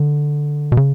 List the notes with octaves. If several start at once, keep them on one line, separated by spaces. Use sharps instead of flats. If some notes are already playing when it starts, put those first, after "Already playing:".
Already playing: D3
B2
C#3